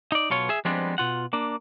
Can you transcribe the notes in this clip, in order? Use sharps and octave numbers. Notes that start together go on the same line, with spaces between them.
D#4 D5
B1 B2 F4 C#5
G#4 E5
F3 G3 G#3 B3 C4 D4
B2 F4 F#5
A#3 D4